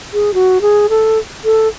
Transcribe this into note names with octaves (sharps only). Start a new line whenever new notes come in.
G#4
F#4
G#4
A4
A4